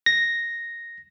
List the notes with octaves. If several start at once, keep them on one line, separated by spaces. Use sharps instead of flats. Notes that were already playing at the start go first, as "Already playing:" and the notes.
A#6